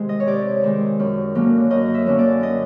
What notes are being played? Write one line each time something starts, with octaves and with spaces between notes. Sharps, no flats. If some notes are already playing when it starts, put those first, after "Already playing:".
Already playing: C3 D#3 G#3
D#5
C#5
C3 D5
D#3 G#3
F#2
D3 F#3 A#3 C#4
F#2 D#5
E5
D3 F#3 A#3 C#4
D5
D#5